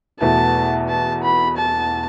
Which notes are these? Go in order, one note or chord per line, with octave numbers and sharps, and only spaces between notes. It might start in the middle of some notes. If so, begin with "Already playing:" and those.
E2 B2 A3 E4 A5
A5
B5
A5